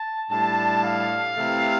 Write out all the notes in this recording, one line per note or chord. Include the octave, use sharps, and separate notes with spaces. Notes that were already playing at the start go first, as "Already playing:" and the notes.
Already playing: A5
A2 G3 D4 A5
F5
C3 E3 A3 E4